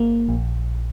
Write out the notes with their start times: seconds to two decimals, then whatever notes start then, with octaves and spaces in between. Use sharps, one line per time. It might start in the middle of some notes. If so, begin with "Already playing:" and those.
Already playing: G1 A#3
0.28 A#1